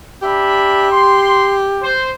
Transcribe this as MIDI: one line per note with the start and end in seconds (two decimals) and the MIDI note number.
0.22 0.87 62
0.22 1.96 67
0.22 0.87 76
0.22 0.87 83
0.91 1.52 84
1.82 2.10 72